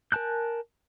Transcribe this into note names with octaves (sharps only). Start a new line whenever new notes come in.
A#4 G#5 A5 F#6 G6